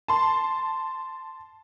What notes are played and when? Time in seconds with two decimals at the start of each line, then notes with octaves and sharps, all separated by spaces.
0.08 A5 C6